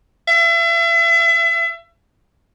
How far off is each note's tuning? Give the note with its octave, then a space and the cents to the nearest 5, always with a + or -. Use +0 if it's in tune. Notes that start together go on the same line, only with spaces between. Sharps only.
E5 +35